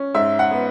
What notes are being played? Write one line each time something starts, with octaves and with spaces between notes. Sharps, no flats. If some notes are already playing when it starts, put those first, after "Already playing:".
Already playing: C#4
G#2 E5
F#5
B3